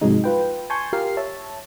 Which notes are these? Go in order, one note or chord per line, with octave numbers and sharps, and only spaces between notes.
G#2 C3 F3 F#3 G#3 D#4
F4 B4 G5
G#5 A5 C6 C#6 G6
F4 G4 A#4 F5 C7
C#5 E5 A5